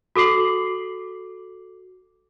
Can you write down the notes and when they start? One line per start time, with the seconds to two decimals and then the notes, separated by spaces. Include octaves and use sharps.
0.16 F#4 A4 D6 C7 F#7